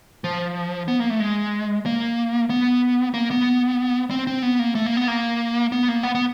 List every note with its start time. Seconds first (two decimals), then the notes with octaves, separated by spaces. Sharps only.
0.24 F3
0.88 B3
1.00 A#3
1.10 A3
1.20 G#3
1.86 A#3
2.50 B3
3.14 A#3
3.31 B3
4.11 C4
4.27 C4
4.42 B3
4.59 A#3
4.75 A3
4.86 A#3
4.97 B3
5.08 A#3
5.72 B3
5.88 A#3
6.03 B3
6.15 B3